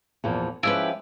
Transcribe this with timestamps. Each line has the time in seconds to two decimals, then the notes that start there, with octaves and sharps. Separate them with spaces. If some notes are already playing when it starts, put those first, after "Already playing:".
0.24 E2 A#2 F3
0.63 F3 G#3 C#4 E4 G4 B4